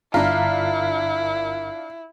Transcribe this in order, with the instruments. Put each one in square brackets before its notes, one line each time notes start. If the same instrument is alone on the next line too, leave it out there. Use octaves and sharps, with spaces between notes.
[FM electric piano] G1 A#4 B6 [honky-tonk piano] D4 F4 [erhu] E4